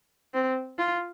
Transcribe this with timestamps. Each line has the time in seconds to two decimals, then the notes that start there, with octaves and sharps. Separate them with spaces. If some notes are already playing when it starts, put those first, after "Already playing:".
0.34 C4
0.79 F4